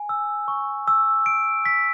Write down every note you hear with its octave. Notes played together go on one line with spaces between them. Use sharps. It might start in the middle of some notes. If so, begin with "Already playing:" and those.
Already playing: G#5
E6
C#6
E6
D7
B6